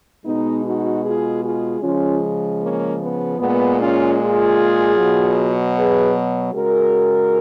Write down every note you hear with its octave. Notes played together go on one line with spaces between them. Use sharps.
B2 G#3 B3 D#4
D#4 F#4
F4 G#4
F4 G#4
C#3 F3 G#3 C#4 F4
A#3 C#4
B3
A#2 G#3 B3
C#4 F4
F4 G#4
B2 F#3
G#4 B4
C#3 G#3 F#4 A#4